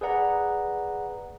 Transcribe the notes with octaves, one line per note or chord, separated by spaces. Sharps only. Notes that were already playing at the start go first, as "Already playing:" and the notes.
G#4 B4 D5 F#5 A#5